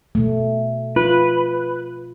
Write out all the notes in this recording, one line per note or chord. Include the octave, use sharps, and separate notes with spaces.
B2 A3
F4 B4